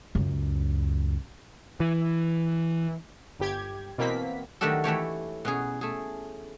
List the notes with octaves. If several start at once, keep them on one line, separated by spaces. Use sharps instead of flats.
C#2 F#2
E3
G1 G4 G#6
B2 E3 A#3 C4 B6
D#3 F#3 A3 D4 G4 A4
E3 A3 G4 C#5
B2 C#4 G#4
A3 G#4